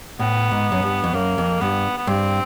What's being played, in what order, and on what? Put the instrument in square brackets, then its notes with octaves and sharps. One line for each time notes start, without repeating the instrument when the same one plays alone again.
[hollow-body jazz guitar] A2 [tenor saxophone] B3
[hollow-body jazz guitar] G#2
F#2
G2
F2
[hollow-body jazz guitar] F#2 [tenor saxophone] A#3
[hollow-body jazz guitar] F2
[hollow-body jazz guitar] G2 [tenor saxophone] B3
[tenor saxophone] B3
[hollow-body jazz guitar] G2 [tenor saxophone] C4